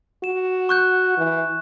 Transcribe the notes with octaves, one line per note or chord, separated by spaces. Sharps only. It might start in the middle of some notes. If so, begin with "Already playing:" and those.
F#4 E7
C#6 F#6 G6
E3